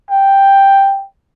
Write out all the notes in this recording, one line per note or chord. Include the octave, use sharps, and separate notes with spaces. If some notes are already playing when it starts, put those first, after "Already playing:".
G5